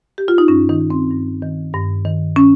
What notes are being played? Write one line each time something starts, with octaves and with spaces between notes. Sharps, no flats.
G4
F4
D#4
G2 C#4
D#3 D#4
D#3
C4
G2
D#3
G2
D#3
C#4